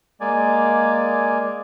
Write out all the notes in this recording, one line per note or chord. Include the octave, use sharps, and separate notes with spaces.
G#3 A#3 D5 G#5